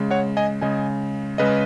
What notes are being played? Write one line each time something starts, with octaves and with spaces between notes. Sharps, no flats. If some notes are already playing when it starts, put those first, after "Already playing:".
Already playing: C#3 G#3
C#5 F#5
D#5 G#5
C#3 G#3 D#5 G#5
C#3 G#3 B4 D#5